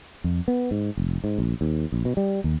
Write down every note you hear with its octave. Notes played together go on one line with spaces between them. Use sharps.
F2
B3
G#2
F1
G#2
A#1
D#2
A#1
B2
G3
D#2